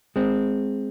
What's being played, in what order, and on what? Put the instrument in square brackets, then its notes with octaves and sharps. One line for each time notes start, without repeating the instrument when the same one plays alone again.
[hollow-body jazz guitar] G#3 C4